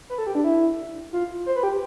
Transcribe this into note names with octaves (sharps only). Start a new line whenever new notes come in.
B4
A4
G4
D4
E4
F4
C5
B4
G4